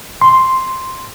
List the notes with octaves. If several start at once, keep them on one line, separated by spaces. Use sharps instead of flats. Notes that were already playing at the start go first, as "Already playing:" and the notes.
C6